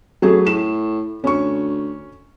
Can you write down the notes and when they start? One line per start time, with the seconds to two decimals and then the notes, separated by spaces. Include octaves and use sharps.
0.22 F#2 F#3 A3 G#4
0.47 A2 E7
1.24 D2 C#4 C#6